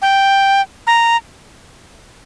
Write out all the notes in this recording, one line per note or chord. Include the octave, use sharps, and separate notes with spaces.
G5
A#5